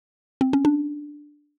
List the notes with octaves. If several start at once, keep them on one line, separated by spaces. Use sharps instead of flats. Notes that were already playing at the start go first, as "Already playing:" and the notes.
C4
C#4
D4